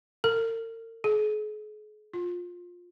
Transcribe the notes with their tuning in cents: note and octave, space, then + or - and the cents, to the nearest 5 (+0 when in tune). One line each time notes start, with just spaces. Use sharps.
A#4 -45
G#4 +40
F4 +15